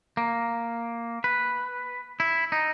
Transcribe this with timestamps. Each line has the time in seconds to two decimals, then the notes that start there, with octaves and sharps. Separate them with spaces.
0.17 A#3
1.24 B4
2.20 E4
2.52 D#4